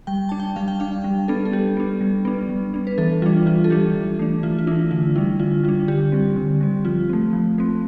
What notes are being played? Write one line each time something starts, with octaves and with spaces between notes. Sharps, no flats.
G3 G5
D4 A5
G5
G3 F5
G5
D4 F5
G3
B3 D4 A4
A4
G3 G4
B3 D4
G3
B3 D4
G3
B3 D4
B4
E3 A4
G3 D4 F4
E3 F4
A4
G3 D4 G4
E3
A3 D4
E3 F4
F4
A3 D4 E4
D3 F4
G3 D4 E4
D3 F4
G3 F4
D4
D3 G4
G3 C4
D3
G3 C4
F3 F4
A3 C4
F3
A3 C4